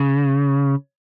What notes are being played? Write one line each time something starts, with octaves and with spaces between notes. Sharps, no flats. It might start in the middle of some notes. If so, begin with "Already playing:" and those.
Already playing: C#3